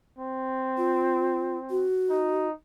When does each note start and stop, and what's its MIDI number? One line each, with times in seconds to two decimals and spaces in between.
0.19 1.85 60
0.77 1.57 65
1.70 2.47 66
2.10 2.52 63